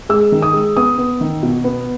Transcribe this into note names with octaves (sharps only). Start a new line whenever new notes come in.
G#3 E6
D#3
D#6
G#3
B3 D#6
B3
D#3
B2
B3